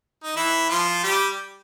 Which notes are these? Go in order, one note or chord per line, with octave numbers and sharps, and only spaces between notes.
D#4
E3 E4
F3 F4
G3 G4